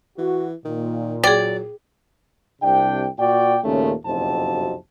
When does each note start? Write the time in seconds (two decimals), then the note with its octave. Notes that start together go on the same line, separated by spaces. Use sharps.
0.18 E3 F#4
0.65 A#2 D#3
1.24 F#3 G#4 D5 G5
2.62 C2 C3 D4 G5
3.19 A#2 F#4 D5 G5
3.64 D#2 A#2 C#3 A3 A#3 C#4
4.05 F#1 B1 F2 C3 F#3 A5